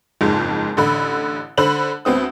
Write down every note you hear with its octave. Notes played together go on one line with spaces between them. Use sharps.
F#1 F2 G#2 G#3
A1 D3 B5
D3 C5 B5 F#7
D2 B3 C4 D#6